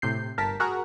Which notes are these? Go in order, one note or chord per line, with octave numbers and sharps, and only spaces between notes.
A2 C3 G6 C7
G1 A#4 A5 B6
F#4 G#4 A#4 F#5 A#5